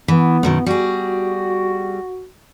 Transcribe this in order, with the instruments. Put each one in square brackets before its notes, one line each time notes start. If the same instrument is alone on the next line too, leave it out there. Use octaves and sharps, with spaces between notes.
[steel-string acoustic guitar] E3 [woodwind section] B3
[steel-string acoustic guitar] F#2 B2 D#3
[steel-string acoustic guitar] G3 G#4 [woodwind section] F#4